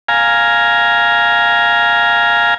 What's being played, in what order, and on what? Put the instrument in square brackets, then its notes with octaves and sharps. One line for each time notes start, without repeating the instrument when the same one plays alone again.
[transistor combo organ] F5 G#5 A#5